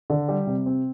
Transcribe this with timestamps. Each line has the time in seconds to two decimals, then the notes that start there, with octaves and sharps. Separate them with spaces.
0.10 D3
0.29 G3
0.47 C3
0.66 C4